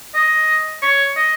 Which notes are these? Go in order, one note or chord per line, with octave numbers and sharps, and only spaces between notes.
D#5
C#5
D#5